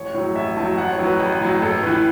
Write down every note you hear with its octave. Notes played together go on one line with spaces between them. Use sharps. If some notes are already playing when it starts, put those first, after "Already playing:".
Already playing: A1 C#5
A2 F#3 C#5
A1 E5
A2 F#3 A5
A1 F#5
C#5
A2 F#3
B4
A1
A2 F#3
A1 A4
A2 E3 B4